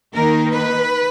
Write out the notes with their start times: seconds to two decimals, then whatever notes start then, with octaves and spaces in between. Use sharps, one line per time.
0.14 D#3 A#3 D#4 A#4
0.51 B4